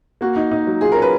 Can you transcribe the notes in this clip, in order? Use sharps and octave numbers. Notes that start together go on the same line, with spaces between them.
A#3 F#4
D#4
D#4
F#3
F4 G#4
A#4
C#4
B4